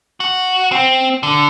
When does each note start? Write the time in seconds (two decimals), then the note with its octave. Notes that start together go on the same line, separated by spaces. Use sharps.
0.20 F#4
0.72 C4
1.23 D3